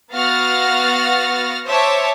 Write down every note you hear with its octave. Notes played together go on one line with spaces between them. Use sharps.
B3 F#4 F5 F6 A6 A#6
C5 C#5 E5 A5 D6